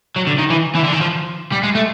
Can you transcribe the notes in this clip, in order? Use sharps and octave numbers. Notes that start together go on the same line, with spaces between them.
F#3
D3
D#3
E3
E3
D3
D#3
F3
G3
G#3
A3